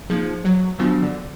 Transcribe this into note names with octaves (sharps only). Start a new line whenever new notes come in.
F3 A#3 D#4 G#4
F#3
D#3 F3 F#3 B3 D4 F#4
D3